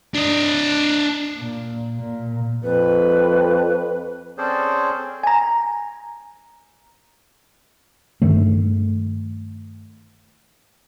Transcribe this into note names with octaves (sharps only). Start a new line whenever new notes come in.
D4 D#5
A#2
A#2
F2 B4
C4 C#4 G#4 A4 C5 D5
G#5 A#5
G2 D#3 A3